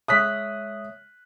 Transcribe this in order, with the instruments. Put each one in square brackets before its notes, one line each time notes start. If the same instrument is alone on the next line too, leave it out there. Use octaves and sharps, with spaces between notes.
[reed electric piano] G#3 C#5 E5 [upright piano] D#6 F#6 B6